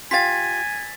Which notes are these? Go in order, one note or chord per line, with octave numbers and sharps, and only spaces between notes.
F4 G4 F5 G#5 A6 B6